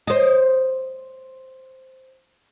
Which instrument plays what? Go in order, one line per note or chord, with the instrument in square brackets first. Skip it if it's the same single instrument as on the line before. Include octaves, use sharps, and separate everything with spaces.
[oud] C5 D#5